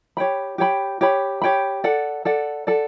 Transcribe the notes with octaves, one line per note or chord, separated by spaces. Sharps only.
G4 C#5 G5 B5
G4 C#5 G5 B5
G4 C#5 G5 B5
G4 C#5 G5 B5
A4 D5 F#5
A4 D5 F#5
A4 D5 F#5